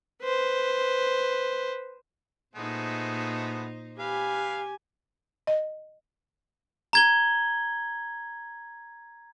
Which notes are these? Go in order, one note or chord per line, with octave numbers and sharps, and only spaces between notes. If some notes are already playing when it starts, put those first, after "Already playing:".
B4 C5
A#2 G#3 A3 B3 D#4 C5
G4 B4 F5 G#5
D#5
A#5 G#6 G7